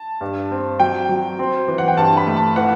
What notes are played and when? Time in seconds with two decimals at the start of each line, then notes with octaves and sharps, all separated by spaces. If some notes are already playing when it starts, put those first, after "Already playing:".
Already playing: A5
0.21 G2
0.51 C4
0.79 F#3 G5
1.09 F#3
1.39 C4
1.68 E3
1.78 F#5
1.88 G5
1.97 G2 A5
2.17 B5
2.26 A3
2.36 A5
2.56 E3 F#5